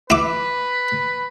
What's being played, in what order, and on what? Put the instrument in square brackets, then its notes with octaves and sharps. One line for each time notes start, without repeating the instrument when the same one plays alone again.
[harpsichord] E4 D6 [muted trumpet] B4